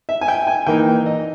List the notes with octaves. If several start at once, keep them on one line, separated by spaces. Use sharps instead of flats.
E5
G#5
G5
G#5
E3 A#3 D#4 G5
D#5